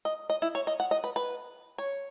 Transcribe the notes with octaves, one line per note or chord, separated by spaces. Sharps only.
D#5
D#5
E4
C#5
D#5
F#5
D#5
B4
B4
C#5